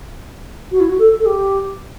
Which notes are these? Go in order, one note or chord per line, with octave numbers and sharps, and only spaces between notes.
F#4
E4
F#4
A4
A4
G4